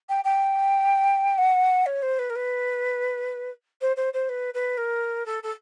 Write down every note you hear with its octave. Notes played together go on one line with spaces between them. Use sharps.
G5
G5
F#5
C#5
C5
B4
A#4
B4
C5
C5
C5
B4
B4
A#4
A4
A4